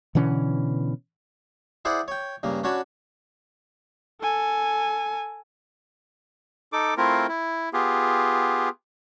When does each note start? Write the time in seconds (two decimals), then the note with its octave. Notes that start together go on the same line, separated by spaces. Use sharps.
0.15 B2 D3 E3 C#4
1.85 E4 G#4 C5 D5 F#5
2.08 C#5 G5
2.43 G2 C#3 A#3
2.63 C#4 D4 F#4 C#5 A5 B5
4.21 A4 G#5
6.73 D#4 A4 D6
6.97 A3 C4 E4 F4 A#4
7.28 E4
7.73 B3 F4 G4 G#4